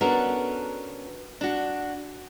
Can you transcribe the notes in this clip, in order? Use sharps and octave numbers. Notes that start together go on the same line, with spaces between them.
B3 C#4 D4 F#4 A4 A#4
D4 F#4